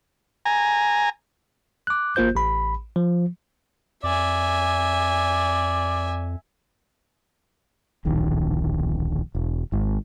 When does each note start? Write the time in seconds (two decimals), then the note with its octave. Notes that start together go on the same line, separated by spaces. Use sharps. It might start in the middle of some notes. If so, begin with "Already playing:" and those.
0.46 G#5 A#5
1.87 D6 F#6
2.16 G#1 A#3 F4 C5 G6
2.35 A1 B5
2.96 F3
4.03 F2 D5 E5 G#5
8.05 D1 A#1 D#3
9.35 E1
9.72 G#1 G#2